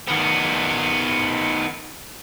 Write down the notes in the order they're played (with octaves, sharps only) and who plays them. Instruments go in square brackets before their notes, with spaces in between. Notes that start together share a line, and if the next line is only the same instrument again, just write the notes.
[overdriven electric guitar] D#3 B3